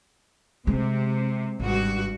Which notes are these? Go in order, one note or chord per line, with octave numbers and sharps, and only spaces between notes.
C3 G#3
G#1 G2 F#4